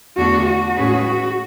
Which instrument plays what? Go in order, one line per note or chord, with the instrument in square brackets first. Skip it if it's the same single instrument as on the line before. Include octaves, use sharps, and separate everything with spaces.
[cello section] E2 D3 A3 D4 [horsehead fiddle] F#4
[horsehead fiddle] F#4
[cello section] A2 G#3 C#4 G#4 B4
[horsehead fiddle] F#4